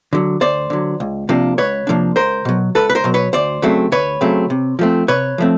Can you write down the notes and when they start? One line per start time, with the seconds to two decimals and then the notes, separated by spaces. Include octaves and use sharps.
0.13 D3 F#3
0.41 D2 C5 D5
0.70 D3 F#3
1.00 C#2
1.29 C3 F3 A#3 D4
1.58 C#2 B4 C#5
1.87 C3 F3 A#3 D4
2.16 C#2 A#4 C5
2.45 B2 F#3
2.75 C#2 A4 B4
2.90 B4
2.95 A#4 C5
3.04 B2 F#3
3.14 B4 C#5
3.33 D2 C5 D5
3.62 C#3 F#3 A3 C4
3.92 D2 B4 C#5
4.21 C#3 F#3 A3 C4
4.50 C3
4.79 F3 A3 C4
5.08 C3 B4 C#5
5.38 F3 A3 C4